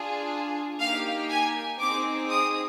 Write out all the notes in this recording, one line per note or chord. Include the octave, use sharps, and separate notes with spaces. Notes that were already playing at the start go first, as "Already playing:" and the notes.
Already playing: D4 F4 G#4
A#3 D#4 G4 F5
G#5
C4 D#4 G#4 D6
D#6